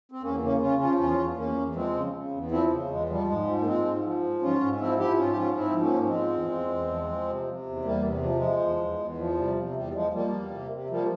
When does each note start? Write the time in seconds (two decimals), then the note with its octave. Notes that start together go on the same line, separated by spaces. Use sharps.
0.12 C4
0.22 E2 A#3 C#4
0.42 C#3 A#3 C#4
0.61 C#3 C#4 F4
0.80 F3 C#4 F4
0.98 E2 C#4 F4
1.18 E2
1.37 E2 A#3 C#4
1.56 E2
1.75 F3 G#3 C4
1.94 C#3
2.13 C#3
2.32 E2
2.51 F3 C4 E4
2.70 C#3
2.89 E2 G#3
3.09 F3 G3
3.27 G#2 G#3
3.47 F3
3.61 A#3
3.66 F3 G#3 C4
3.85 G#2
4.04 F3
4.22 G#2
4.41 G#2 C#4 F4
4.61 G#2
4.80 F3 C4 E4
4.99 F3 E4 G4
5.18 G#2 C#4 F4
5.32 G4
5.37 F3 C#4 F4
5.56 G#2 C4 E4
5.76 F3
5.81 A#3 C#4
5.94 G#2
6.03 C#4
6.07 G#3 C4
6.14 F3
6.32 E2
6.51 E2
6.70 E2
6.90 F3
7.09 F3
7.28 C3
7.47 C3
7.66 E2
7.85 E2 G3 A#3
8.04 C3
8.23 F3
8.36 G#3
8.42 F3
8.61 E2
8.80 E2
8.99 E2
9.18 F3
9.38 C3 G3
9.57 C3
9.76 E2 G3
9.94 F3 G#3
10.13 F3 G3 A#3
10.33 E2
10.51 C3
10.71 C3
10.90 F3 G3 A#3